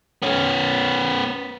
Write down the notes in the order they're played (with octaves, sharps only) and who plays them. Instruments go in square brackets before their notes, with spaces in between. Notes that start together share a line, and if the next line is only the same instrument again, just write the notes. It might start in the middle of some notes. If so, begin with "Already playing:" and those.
[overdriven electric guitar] B3 C#4